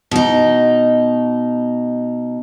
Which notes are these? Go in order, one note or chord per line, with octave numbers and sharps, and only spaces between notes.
B2 D#4